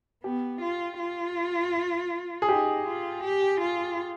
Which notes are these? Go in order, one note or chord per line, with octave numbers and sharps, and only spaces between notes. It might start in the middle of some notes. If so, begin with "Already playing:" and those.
B3 G4
F4
F4
G#4
D#4 G4
F4
G4
F4